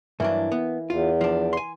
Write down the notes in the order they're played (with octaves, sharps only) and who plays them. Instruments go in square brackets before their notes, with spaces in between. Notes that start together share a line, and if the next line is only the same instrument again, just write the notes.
[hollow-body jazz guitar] G2 F#3 D4 [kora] E3 A#3
[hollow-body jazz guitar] B3
[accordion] E2 [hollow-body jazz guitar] F4
[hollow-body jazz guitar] F3 D4
G#5 C6